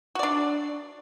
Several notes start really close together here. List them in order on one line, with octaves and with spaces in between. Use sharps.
F#4 D5 D4